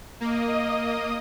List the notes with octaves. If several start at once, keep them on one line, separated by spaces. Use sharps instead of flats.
A#3 D#5 D#6